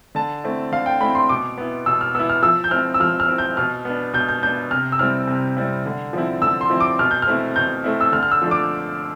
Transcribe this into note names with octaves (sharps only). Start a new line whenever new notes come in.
D3 A5
A3 C4 E4
D3 F5
G5
A3 C4 E4 B5
C6
B2 D6
B3 E4
B2 E6
F6
B3 E4 E6
F6
F3 E6
G6
C4 E4 F6
E6
F3 F6
F6
C4 E4
G6
B2 F6
B3 D4
B2 G6
G6
B3 D4 G6
C3 F6
E6
G3 C4 E4 F6
C3
G3 C4 E4
D3
F3 C4 E4
D3 E6
C6
F3 C4 E4
D6
B2 F6
G6
F6
A3 C4 E4
B2 G6
A3 C4 E4
E6
D3 F6
F6
E6
F3 A3 D4
D6